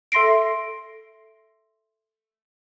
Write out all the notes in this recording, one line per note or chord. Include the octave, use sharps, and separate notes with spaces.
A4 E5 C6 A#6 C7 D7